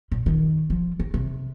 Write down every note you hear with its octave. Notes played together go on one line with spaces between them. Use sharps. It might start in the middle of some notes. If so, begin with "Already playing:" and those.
A#2
D#3
F3
D#3
C3